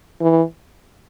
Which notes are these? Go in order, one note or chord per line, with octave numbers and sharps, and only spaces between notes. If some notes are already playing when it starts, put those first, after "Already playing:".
E3